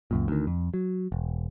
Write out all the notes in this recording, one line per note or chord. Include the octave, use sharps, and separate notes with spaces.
C#2 F#2 A#2
D2 D#3
F2
F#3
E1